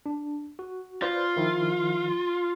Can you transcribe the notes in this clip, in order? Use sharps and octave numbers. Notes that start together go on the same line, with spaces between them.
D4
F#4
F4 B4 C5 D5
D#3 F3 E4